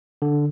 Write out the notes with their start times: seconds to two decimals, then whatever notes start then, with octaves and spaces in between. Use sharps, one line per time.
0.22 D3